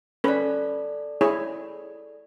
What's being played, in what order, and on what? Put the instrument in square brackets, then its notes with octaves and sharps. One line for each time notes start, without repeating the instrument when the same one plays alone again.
[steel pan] C#4 B4 [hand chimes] A4 D5
[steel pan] E4 G#4 C#5